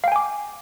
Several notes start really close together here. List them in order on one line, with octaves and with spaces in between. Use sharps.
F5 G5 G#5 D6